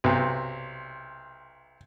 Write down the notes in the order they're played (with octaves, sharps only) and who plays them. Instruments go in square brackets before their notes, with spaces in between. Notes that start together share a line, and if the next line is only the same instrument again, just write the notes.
[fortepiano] B1 C3